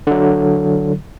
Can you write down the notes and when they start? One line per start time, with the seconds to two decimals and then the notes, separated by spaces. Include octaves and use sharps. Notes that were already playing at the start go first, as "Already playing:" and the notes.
0.07 D3 F#3